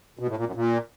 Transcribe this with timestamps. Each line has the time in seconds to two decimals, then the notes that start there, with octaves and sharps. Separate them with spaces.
0.19 B2
0.28 A2
0.37 A#2
0.46 F#2
0.55 A#2